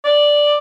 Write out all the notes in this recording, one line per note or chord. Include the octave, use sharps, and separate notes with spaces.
D5